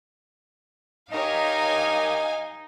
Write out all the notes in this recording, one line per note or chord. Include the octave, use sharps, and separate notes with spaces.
D#4 G4 A#4 C#5 D#5 F5 G#5